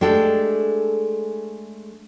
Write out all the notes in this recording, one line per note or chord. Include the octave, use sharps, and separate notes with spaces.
G#3 A3 D4 G4 A4 G5